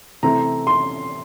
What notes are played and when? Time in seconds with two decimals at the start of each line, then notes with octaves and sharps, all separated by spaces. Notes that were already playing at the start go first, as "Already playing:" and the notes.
0.23 C3 E3 A3 C4 A#5
0.67 C6